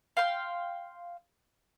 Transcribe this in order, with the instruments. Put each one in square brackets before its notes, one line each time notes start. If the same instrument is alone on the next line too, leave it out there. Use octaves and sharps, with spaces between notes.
[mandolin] F5 G5 C6